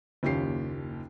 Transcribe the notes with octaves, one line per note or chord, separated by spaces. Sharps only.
F#1 D#2 C#4 F4 G4 C7